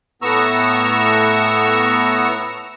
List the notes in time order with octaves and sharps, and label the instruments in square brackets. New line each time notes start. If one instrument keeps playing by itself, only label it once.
[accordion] A2 B3 A#5 C#6 E6